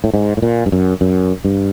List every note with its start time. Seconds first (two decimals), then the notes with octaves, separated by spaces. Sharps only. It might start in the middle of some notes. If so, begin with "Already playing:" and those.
0.04 A2
0.14 G#2
0.37 A2
0.42 A#2
0.66 G2
0.72 F#2
1.01 F#2
1.45 G2